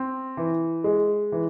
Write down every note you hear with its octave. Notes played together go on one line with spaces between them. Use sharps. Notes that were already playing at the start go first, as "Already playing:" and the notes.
Already playing: C4
E3
G#3
E3